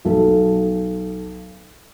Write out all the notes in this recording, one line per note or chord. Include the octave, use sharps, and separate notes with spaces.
B1 A4